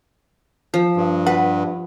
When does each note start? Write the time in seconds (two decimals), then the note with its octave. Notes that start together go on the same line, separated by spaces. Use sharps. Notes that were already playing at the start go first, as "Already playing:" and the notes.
0.74 F3
0.96 G2
1.27 B4 F#5